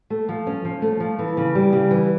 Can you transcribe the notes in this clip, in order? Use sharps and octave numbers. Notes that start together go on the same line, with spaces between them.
A3
F3
C#4
F3
A3
F3
E3
C#3
G3
C#3
E3